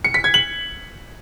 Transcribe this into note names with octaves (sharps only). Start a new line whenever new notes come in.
C#7
B6
G#6
F#7